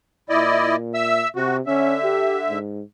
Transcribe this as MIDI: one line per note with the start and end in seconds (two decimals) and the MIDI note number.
0.29 1.24 46
0.29 0.76 64
0.29 0.76 74
0.29 0.76 75
0.94 1.28 76
0.94 1.28 88
1.36 1.61 48
1.36 1.57 66
1.67 2.59 50
1.67 1.96 61
1.67 2.59 76
2.03 2.37 67
2.50 2.82 44